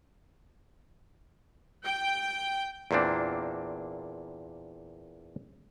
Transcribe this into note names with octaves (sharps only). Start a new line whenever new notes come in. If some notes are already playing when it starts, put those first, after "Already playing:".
G5
E2 A#2 A#3 C4 D4